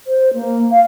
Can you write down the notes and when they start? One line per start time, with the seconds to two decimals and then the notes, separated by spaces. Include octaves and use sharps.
0.07 C5
0.34 A#3
0.72 F5